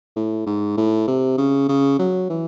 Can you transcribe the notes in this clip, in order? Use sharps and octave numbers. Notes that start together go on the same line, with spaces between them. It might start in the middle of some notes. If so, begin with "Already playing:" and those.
A2
G#2
A2
C3
C#3
C#3
F#3
E3